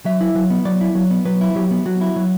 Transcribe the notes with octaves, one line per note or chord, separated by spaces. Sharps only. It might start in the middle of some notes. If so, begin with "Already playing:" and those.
F#3 E5
E4
F#3
B3
F#3 D5
E4
F#3
B3
F#3 B4
E4
F#3 G4
B3
F#3 F#4
E4
F#3